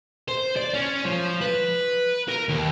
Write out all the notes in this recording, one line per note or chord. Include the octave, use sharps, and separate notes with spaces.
C5
D5
C#4
F3
B4
A#4
D#2